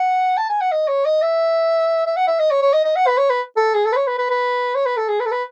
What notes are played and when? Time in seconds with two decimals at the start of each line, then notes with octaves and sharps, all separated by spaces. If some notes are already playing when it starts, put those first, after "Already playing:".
Already playing: F#5
0.37 A5
0.49 G#5
0.61 F#5
0.72 D#5
0.88 C#5
1.05 D#5
1.22 E5
2.06 E5
2.16 F#5
2.27 E5
2.39 D#5
2.51 C#5
2.62 C#5
2.73 D#5
2.84 D#5
2.95 F#5
3.07 B4
3.17 C#5
3.30 B4
3.57 A4
3.74 G#4
3.85 A4
3.92 B4
3.96 C#5
4.07 B4
4.18 B4
4.30 B4
4.75 C#5
4.85 B4
4.97 A4
5.08 G#4
5.20 B4
5.26 A4
5.31 B4